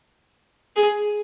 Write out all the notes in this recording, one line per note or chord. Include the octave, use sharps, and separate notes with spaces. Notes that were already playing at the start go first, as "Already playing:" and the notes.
G#4